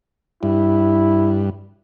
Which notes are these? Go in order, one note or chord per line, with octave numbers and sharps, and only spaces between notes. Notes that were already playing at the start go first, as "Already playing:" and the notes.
G2 E4